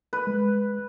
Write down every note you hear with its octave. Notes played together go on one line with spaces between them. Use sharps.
B4
G#3